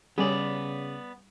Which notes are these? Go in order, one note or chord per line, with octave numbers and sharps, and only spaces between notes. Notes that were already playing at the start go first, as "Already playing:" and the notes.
C#3 G3 B3 C#4 G#4 D5